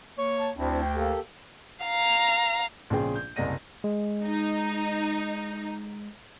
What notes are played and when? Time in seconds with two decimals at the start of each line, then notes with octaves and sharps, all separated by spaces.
0.17 A#3 C#5
0.40 A5
0.56 D2 C4 D4 E4
0.81 G5
0.95 A#3 G4 A4
1.84 F5 A#5
2.90 A#1 C#3 C4 G#4 G5
3.15 G6
3.36 F#1 C2 D5 D#5 A#6 D#7
3.84 G#3
4.26 D#4